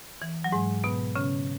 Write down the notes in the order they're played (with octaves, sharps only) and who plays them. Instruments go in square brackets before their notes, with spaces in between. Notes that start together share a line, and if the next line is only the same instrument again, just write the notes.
[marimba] E3
F#3
G#2 G#3
B2 B3
C#3 C#4